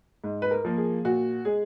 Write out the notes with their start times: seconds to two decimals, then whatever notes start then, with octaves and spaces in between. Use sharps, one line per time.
0.24 G#2
0.42 B4
0.51 A#4
0.65 F3 A#3
0.77 G#4
1.05 A#2 F#4
1.45 G#3 G#4